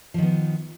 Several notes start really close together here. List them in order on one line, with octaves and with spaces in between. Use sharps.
F3 D#3 B3